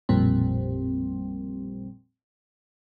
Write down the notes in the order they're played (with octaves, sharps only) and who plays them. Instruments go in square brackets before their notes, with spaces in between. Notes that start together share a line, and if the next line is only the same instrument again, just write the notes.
[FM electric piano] A1 F2 A#2 G3 C4